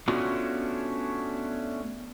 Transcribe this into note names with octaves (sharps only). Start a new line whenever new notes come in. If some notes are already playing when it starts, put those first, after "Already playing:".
A3 B3 C#4 D4 F4 F#4